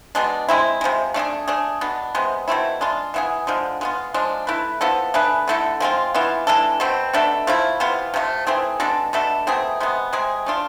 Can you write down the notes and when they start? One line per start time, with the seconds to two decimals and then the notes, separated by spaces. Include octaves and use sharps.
0.15 B2 G#3 D4
0.49 G#3 C4 E4
0.81 C3 F3 G#3
1.14 A3 D4 F4 G#4
1.48 A3 D4 G#4
1.81 B2 B3 D4
2.15 C3 G#3 B3
2.48 B2 A3 C4 E4
2.81 G#3 D4 F4
3.14 E3 B3 E4 G#4
3.47 D3 F3 G#3
3.81 G#3 B3 F4
4.14 F3 G#3 D4
4.47 A3 E4 B4
4.81 F3 B3 E4 A4
5.14 A3 D4 G#4 B4
5.48 D3 A3 E4 A4
5.80 F3 G#3 C4 F4
6.14 E3 B3 F4
6.47 E3 G#3 D4 A4
6.80 B2 A3 C4
7.13 B2 A3 D4 A4
7.47 F3 A3 E4
7.80 C3 E3 B3 F4
8.14 C3 F3 A3
8.47 E3 A3 C4 G#4
8.80 B2 G#3 D4 A4
9.13 B2 A3 D4 A4
9.47 B2 A3 C4 G#4
9.80 C3 G#3 B3
10.13 C3 G#3 C4 G#4
10.46 A3 D4 F4